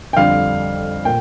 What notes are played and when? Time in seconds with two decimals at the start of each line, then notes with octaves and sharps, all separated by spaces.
0.13 G5
0.16 F2 D3 G3 F5
1.05 A#2 G5